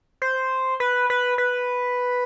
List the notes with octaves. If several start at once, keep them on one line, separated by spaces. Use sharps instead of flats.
C5
B4
B4
B4